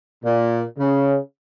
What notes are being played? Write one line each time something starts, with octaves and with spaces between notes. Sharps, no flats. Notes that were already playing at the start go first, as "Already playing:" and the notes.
A#2
C#3